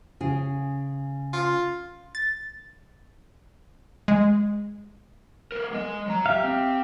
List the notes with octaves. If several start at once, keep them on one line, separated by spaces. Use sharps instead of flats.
C#3 G#4
F4
A6
G#3
B3 A#4
G#3 D#5
F#3 A#5
G4 E5 F5
C4